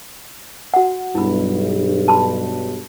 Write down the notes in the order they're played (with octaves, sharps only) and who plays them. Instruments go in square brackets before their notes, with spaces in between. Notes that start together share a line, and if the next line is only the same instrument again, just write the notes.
[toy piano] F#4 F#5
[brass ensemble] B1 G2 [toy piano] E4 B5
[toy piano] A5 B5 C6